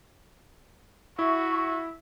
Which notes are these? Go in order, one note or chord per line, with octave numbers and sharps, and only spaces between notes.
E4 F#4 E5 C#6